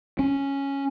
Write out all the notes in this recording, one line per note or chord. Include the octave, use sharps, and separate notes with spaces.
C#4